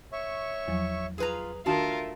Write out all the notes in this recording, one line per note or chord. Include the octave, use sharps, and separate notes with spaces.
C#5 E5 C#6
E2 F3 F#3
F4 G#4 B4 A#5
D#3 A3 D4 F4 F#4 A#4 E5 A5